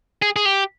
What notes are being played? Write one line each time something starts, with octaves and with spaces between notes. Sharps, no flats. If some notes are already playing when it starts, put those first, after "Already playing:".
G#4
G#4
G4